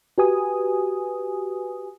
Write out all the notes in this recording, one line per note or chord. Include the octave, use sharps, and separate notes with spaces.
F#4 G4 B4 G#5 D#6